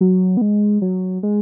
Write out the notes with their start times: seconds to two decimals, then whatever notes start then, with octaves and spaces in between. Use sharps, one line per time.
0.01 F#3
0.37 B3
0.41 G#3
0.82 F#3
1.23 G#3